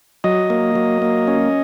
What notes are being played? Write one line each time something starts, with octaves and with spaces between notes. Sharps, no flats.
F#3 D#5
A#3
F#3
A#3
C#4